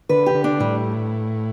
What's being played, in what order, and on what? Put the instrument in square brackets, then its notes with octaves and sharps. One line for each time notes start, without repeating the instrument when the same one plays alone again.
[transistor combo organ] D3 [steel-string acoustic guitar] B4
[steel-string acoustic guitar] G4
[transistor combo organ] D3
[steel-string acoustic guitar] D4
[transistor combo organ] A2 [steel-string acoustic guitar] G3